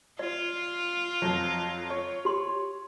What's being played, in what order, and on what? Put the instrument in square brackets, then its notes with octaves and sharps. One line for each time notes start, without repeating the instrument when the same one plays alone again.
[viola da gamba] F4 [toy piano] D5
[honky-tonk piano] F2 F3 F#3
C#5
[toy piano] G4 C6